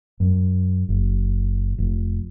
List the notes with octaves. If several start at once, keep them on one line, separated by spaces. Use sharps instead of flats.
F#2
F#1
F1